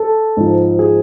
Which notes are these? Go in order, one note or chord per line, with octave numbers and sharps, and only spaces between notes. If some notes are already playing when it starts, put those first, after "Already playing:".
Already playing: A4
G#2 F3
G#4